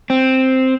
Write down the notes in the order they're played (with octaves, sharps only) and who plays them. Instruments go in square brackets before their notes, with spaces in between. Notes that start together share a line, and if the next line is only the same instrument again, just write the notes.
[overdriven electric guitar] C4